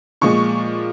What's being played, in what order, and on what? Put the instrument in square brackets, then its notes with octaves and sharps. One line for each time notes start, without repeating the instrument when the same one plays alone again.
[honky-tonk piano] A#2 F3 G#3 C#6